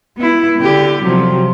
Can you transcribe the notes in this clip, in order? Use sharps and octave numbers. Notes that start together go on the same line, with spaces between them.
B3 E4
D3 G4
C3 F3 F#3